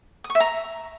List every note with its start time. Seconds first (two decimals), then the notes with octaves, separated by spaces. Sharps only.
0.24 D#6
0.30 C#6
0.35 E5
0.40 A#5